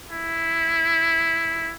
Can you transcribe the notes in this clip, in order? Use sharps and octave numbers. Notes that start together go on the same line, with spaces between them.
E4